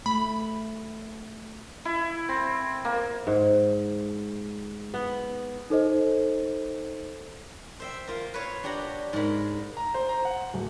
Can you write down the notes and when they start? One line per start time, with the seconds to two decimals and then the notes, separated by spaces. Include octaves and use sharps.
0.06 A3 B5
1.85 E4
2.29 C4
2.85 A#3
3.27 G#2
4.94 B3
5.70 D#4 A4 C5 D#5
7.80 C5 E5 G5
8.08 A#3 F4
8.34 B4 C#5 F5
8.63 D4 G4 C#5 F#5 A#5 B5
9.13 G#2 G#3 A#4 B5
9.77 A#5
9.94 C5
10.09 A#5
10.25 F#5
10.54 D1